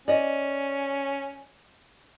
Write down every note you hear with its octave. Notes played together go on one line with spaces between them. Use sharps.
C#4 D5 D#5